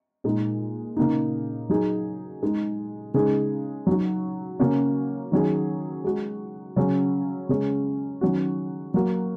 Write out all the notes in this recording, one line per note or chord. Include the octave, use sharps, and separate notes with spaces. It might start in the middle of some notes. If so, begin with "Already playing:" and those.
A#2 G#3 D#4 G#4
C#3 A#3 D#4
F#3 D#4 G#4
G#3 D#4 G#4
C#3 G#3 D#4 G#4
F#3 D#4 F#4
C#3 A#3 C#4 F#4
D#3 F#3 C#4 G#4
G#3 F#4
C#3 F#3 C#4 G#4
C#3 G#3 C#4 G#4
D#3 F#3 C#4 F#4
F#3 A#3 F#4